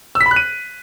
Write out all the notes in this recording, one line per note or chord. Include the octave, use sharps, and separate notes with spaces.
E6
B6
B5
F#6
D#7